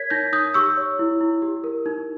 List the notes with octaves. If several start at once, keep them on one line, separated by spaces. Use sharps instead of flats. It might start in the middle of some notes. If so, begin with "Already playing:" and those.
Already playing: A#4 C#5 G#6 B6
D#4 G6 A#6
D#4 D#6 G6
G4 C#6 E6
C#5
E4
E4
G4
A#4
D#4